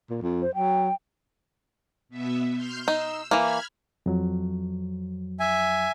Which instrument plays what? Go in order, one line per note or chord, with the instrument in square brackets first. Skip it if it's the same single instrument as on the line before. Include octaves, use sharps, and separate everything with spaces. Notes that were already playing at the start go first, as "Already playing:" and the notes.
[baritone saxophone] A#2
F2
[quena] C5
[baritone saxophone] F#3 [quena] G5
[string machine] B2 B3 E5
C6 F6 G6
[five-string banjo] D#4 [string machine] E6
[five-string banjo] E3 A#3 [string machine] B5 F6 G#6
[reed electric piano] F2 F#3
[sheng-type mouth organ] E5 G#5